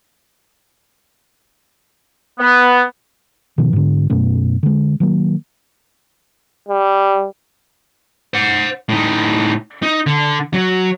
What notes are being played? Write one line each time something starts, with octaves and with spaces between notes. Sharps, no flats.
B3
B2 D#3 F3
G#2 D3
F#2 B2 A3 C#4
D3 G#3
D#3 F#3 A#3
G3
C5 F#5
A2 D#4
D#4
D3
F#3